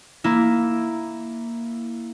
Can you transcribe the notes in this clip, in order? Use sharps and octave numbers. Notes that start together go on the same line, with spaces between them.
A#3 E4